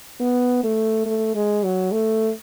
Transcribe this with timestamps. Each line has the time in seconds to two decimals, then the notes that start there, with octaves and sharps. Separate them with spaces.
0.20 B3
0.64 A3
1.06 A3
1.35 G#3
1.64 F#3
1.92 A3